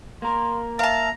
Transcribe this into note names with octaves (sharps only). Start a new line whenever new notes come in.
A#3 A#4 C6
E5 F5 A5 A#5